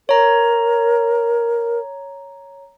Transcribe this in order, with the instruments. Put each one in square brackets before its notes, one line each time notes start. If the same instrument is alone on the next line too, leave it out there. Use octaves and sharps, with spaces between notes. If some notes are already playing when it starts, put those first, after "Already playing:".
[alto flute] A#4 [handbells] C#5 A#5